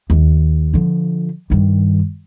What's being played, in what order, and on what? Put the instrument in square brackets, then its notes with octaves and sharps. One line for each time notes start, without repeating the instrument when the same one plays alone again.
[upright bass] D#2
D3 F3
G2 D#3